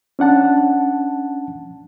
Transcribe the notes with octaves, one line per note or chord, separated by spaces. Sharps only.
C#4 D4 F#5 A5